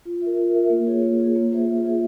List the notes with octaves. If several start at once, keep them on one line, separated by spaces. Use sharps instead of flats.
F4
A#4 E5
F4
A#4 E5
A#3
F4 G#4 C#5
A#3
F4 G#4 C#5
A#3
F4 G#4 C5 E5
A#3
F4 G#4 C5 E5